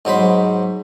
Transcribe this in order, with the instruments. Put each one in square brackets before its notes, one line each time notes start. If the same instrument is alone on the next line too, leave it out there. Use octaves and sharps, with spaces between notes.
[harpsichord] G#2 F#3 C5 B5